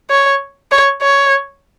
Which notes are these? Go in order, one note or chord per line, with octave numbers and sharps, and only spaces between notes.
C#5
C#5
C#5